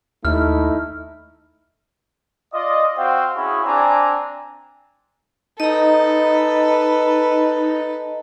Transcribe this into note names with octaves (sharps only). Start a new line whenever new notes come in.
D#2 A3 D#4 E4 F6
F4 D5 D#5
C4 F#4 C5 F5 G5
C#4 E4 F#4 G#4
C4 D4 D5 G#5 A#5
D#4 A4 B4 D#5 A#5